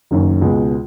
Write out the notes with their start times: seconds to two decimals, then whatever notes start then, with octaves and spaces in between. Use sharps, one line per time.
0.11 F#1 F#2 D#3
0.41 C#2 B2 G#3